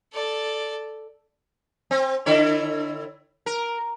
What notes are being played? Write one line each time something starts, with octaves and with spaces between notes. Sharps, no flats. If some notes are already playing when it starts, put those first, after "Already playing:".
A4 D5
C4
D3 E4 C#5
A#4